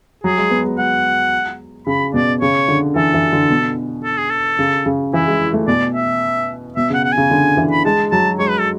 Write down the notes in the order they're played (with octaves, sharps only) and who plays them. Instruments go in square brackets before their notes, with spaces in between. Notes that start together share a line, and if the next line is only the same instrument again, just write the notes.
[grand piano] F#3 [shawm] G#4
[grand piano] G#3
B3
G#3
[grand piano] G#3 [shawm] F#5
[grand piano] C#3 [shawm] B5
[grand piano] B2 [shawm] D5
[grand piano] C#3 [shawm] C#5
[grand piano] D3
[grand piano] E3 [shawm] A4
[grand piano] E3
D3
B2
[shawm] A4
G#4
A4
[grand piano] C#3
C#3
[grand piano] E3 [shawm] E4
[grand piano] G#3
A3
[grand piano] B2 [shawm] D5
[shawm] E5
[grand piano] B2 [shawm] E5
[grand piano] C#3 [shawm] F#5
[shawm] F#5
G#5
[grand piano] C#3
D3
E3
[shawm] B5
[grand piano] G#3 [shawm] A5
[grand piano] F#3 [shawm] A5
[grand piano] G#3 [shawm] C#5
[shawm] B4
A4